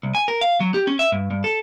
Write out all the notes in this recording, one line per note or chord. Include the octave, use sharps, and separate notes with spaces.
C2
G#5
A#4
F5
F#3
G4
C#4
E5
G2
G2
A4